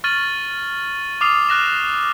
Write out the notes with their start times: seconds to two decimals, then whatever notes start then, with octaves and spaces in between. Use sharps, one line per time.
0.04 C#6 F6 A6 D#7 F#7
1.21 D6 D#6 F6 C7 F7
1.49 F6 F#6 A#6 E7